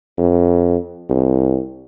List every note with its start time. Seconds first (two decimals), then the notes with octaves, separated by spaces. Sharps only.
0.18 F2
1.09 C2